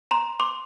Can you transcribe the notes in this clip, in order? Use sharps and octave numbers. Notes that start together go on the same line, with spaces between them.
A#5 C6
C6 D6